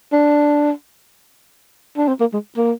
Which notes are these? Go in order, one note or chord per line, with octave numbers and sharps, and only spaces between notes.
D4
D4
C4
A#3
G#3
A#3